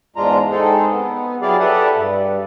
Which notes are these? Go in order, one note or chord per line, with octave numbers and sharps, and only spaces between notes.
E2 G#2 G#3 D4 F4 A#5
G#3 C4 D#4 G#4 A4
B3
F#3 E4 G4 G#4 D5 F5
G4 A4 B4 D5 E5 F#5
G2